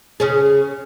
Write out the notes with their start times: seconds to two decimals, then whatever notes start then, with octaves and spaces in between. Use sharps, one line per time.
0.20 C#3 C#4 G#4